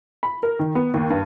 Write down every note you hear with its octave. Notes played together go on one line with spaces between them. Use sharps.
B5
A#4
D#3
B3
D#2
G2